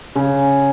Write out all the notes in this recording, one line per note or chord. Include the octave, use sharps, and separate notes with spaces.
C#3